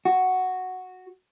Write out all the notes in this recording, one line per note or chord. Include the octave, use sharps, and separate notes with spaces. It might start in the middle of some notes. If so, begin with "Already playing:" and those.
F#4